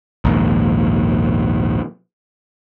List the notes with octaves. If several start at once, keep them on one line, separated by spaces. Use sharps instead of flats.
A#1 D#2 G#2